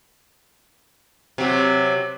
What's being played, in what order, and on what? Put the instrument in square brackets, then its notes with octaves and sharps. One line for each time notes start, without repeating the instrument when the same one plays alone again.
[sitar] C3 F#3